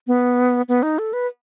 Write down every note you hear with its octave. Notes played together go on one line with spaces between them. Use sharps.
B3
B3
D#4
A4
B4